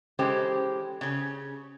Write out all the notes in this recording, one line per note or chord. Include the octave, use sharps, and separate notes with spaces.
E3 G#3 C#4 G4 A4 C5
C#3 C#4